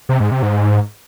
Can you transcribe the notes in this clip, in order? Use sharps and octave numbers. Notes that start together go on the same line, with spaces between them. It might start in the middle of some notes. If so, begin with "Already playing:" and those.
C3
G#2
C3
G#2